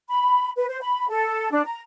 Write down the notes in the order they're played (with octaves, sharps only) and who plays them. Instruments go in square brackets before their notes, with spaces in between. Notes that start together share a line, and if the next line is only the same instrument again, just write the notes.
[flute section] B5
B4
C5
B5
A4
D4
A#5